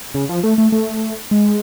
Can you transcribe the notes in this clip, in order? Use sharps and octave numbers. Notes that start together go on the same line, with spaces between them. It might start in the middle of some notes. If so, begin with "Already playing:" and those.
C#3
F3
A3
A3
A3
G#3